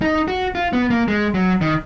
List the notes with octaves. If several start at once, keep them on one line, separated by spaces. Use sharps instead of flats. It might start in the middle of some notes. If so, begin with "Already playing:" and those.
D#4
F#4
F4
B3
A#3
G#3
F#3
D#3